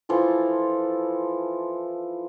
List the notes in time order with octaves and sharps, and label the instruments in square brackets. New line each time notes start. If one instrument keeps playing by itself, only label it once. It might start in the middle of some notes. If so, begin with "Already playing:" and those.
[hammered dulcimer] E3 F3 F4 A4